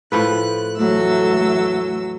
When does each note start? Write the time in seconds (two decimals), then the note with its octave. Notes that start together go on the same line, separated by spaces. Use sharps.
0.12 A2 F3 B4 F#6
0.77 E2 F#3 A3 E6